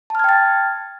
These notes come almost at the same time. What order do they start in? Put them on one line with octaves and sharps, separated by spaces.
A5 F6 G#6 G5 A6